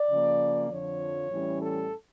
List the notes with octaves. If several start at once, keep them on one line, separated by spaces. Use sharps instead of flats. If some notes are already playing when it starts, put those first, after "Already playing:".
Already playing: D5
C#3 F3 A#3
F2 D3 F3 C#5
A2 E3 G3 C#4
A4